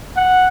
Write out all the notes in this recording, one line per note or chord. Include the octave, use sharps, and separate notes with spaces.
F#5